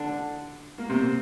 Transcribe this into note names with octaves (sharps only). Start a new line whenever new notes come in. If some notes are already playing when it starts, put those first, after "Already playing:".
Already playing: D3 D4
A#3
C3 C4